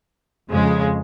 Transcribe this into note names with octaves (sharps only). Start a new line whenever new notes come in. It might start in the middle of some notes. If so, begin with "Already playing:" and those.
F2 C#3 G#3